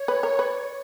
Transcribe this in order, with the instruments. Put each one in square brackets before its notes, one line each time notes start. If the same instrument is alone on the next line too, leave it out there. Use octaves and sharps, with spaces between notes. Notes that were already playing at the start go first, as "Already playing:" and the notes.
Already playing: [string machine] C#5
[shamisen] B4
A#4
[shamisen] B4 [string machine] D5